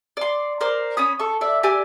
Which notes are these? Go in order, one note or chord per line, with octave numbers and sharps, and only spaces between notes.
D5 C6
A#4 C5 D5 C6
C#4 C#5 B5 D#6
A4 C#6
D5 E5
G4 D5 G#5 E6